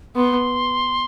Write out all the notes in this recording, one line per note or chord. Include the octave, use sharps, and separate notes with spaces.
B3 C6